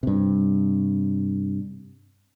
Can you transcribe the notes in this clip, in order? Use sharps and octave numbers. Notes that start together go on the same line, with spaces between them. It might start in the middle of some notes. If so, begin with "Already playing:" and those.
G2 C3